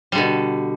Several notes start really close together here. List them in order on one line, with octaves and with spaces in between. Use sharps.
G3 D3 B2